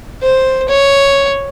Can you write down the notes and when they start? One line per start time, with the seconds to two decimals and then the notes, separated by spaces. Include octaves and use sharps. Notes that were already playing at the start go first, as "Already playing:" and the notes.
0.22 C5
0.68 C#5